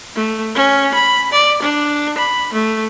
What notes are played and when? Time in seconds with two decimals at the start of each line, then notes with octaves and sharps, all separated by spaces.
0.15 A3
0.55 C#4
0.94 B5
1.32 D5
1.62 D4
2.18 B5
2.53 A3